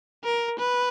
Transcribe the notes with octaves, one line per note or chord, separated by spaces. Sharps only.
A#4
B4